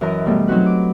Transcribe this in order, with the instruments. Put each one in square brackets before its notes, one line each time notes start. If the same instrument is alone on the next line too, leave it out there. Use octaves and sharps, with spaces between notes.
[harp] F#2 E3 A#4 D#5 A#5
B2 G3 A3
F#3 C4 D#4 F#4 B4
D6